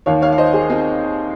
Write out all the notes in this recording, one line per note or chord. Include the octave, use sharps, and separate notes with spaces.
D#2 D#3 C#5 F5
C#5 F5
F5
C5 D#5
G#4 C5
C4 D#4